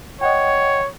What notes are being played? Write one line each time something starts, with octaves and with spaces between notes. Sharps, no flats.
C#5 D#5 F#5 G5